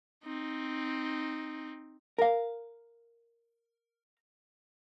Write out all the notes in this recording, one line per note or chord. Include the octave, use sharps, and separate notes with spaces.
C4 D#4
A#4 F5